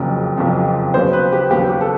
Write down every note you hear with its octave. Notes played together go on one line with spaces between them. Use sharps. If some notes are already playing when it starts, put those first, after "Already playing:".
Already playing: F#1 F2 C#3 F3
F#1 F2 C#3 F3
D#2 C#3 F#3 B3 C5
B4
G4
D#2 C#3 F#3 B3 G4
G4
A4